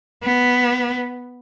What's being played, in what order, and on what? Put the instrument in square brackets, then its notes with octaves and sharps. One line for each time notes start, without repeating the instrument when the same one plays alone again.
[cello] B3